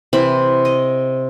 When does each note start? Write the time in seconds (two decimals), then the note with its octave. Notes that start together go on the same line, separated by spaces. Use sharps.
0.13 C3 E3 C5 B5
0.65 D#5